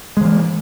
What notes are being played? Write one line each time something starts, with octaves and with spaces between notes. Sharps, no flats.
E3 G#3 A#3